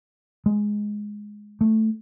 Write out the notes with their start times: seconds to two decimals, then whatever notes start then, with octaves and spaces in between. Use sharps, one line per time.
0.46 G#3
1.61 A3